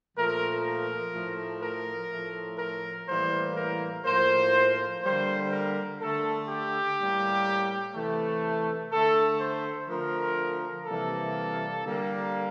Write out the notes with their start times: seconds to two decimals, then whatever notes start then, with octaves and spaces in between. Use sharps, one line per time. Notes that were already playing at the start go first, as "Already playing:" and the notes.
0.16 A#2 F3 A3 A#4
0.64 A#4
1.13 A2 F3 A3
1.63 A#4
2.11 A2 F3 A3
2.59 A#4
3.08 A2 E3 G3 A#3 C5
3.57 A#4
4.05 A2 F3 A#3 C5
5.03 D3 G3 A#3 C5
5.51 A#4
6.00 D3 A3 A4
6.49 G4
6.98 A2 G3 A#3
7.95 C3 E3 A3
8.92 D3 A3 A4
9.40 C5
9.89 D3 F3 A3 A#4
10.86 C3 E3 G3 A#3 A4
11.84 D3 G3 A#3